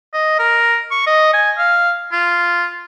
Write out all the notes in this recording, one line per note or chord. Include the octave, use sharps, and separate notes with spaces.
D#5
A#4
C#6
D#5
G#5
F5
F4